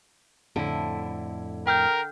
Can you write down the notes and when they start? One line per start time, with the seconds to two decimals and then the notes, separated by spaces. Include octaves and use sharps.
0.56 F2 A2 D3 E4
1.67 A#4 G5 F6 G6